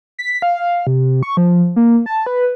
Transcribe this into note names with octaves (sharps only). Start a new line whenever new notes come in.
B6
F5
C3
C#6
F3
A#3
A5
B4